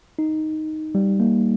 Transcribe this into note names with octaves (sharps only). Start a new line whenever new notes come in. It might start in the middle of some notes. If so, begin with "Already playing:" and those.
D#4
G3
A#3